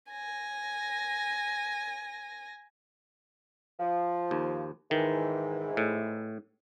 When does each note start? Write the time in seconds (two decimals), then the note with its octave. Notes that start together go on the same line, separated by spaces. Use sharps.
0.11 G#5 A#6
3.80 F3
4.31 D#2
4.91 G#2 D#3 E3
5.77 A2